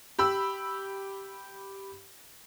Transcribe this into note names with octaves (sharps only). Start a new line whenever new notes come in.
G4 B5 E6